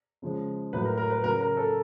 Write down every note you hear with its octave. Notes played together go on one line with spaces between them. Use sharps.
C#3 F3 G#3
A2 F#3 B4
A#4
A#4
B4
C#3 F#3 A#4
A#4
A4